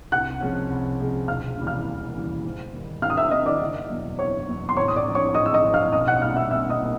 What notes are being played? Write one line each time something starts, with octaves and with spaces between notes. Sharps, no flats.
C2 F#5 F#6
C3 F3 G#3 C#4
C2
C3 F3 G#3 C#4
E1 F5 F6
D#2 C#3 E3 G3
F5 F6
E1
D#2 C#3 E3 G3
G#2
D#3 G3
G#2 F5 F6
D#6
E5 E6
D#3 G3 D#5 D#6
D5 D6
F#1
E2 B2 F#3
F#1 C#5 C#6
E2 B2 F#3
C6
A1 C#5 C#6
D#6
D5 D6
G#2 F3
C#5 C#6
A1 D#5 D#6
E6
D#5 D#6
G#2 F3
F5 F6
B1 D#5 D#6
F#5 F#6
A#2 G3 F5 F6
E5 E6
B1 E5 E6
D#5 D#6
A#2 G3